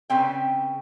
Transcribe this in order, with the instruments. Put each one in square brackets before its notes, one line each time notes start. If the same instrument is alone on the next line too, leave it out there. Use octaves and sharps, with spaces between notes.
[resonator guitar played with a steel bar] C#3 B3 C4 G5